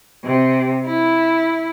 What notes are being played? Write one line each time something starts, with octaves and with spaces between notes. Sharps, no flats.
C3
E4